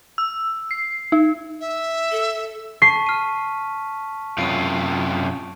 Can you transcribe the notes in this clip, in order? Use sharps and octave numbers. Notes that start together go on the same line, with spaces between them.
E6
C7
D#4
E5
A4
A5 C#6 B6 C7
F6 D#7
F#2 C3 F4 D7 D#7